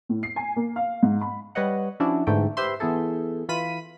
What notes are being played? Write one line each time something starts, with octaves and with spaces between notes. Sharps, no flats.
A2
C7
G#5
A#3
F5
G#2
B5
G3 B4 C#5 D#5 F#5
F3 C#4 D4 E4 F#4
G#2 D3 E3 A3 G5
G4 B4 C5 E5 C6
E3 B3 E4 G#4 A4
E3 F4 B5 B6 D#7